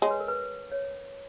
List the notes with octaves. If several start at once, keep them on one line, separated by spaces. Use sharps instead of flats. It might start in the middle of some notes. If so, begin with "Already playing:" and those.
G#3 C#5
B4
A#4
B4
C#5